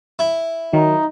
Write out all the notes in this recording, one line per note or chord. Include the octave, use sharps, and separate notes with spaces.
E4
D#3 F#3 D#4